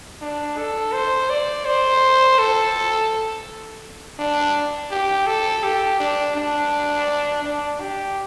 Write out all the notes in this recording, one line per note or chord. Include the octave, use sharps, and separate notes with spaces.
D4
A4
C5
D5
C5
A4
D4
G4
A4
G4
D4
D4
D4
G4